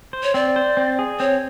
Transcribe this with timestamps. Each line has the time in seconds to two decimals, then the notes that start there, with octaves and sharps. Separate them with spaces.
0.13 C5
0.23 C#5
0.34 C4 D5
0.56 C5
0.77 C4
0.99 G#4
1.20 C4 C#5